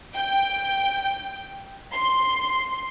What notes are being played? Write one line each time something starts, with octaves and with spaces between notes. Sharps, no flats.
G5
C6